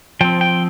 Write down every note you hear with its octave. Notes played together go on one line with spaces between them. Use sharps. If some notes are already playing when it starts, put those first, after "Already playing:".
F3 C4 G5
G5